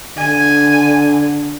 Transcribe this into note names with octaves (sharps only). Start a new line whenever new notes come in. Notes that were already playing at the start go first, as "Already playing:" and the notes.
D3 G#5